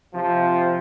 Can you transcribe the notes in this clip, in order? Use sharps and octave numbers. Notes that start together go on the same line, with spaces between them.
C3 F3